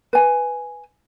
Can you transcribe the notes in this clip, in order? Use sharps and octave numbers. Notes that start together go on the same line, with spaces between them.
B4 G#5